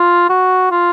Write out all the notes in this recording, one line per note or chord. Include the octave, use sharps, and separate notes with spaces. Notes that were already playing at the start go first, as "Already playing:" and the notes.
Already playing: F4
F#4
F4